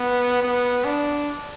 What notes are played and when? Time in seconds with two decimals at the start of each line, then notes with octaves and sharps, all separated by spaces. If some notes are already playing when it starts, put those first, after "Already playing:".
Already playing: B3
0.43 B3
0.85 D4